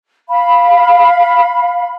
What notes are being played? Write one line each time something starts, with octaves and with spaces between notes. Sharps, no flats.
F5 B5